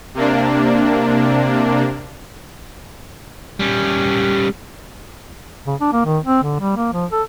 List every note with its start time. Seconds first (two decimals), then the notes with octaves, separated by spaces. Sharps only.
0.14 C3 A#3 D4
3.60 G3 C#4
5.67 C#3
5.80 D4
5.93 A#3
6.05 D#3
6.25 C4
6.43 D3
6.60 G3
6.76 A#3
6.93 F3
7.12 A4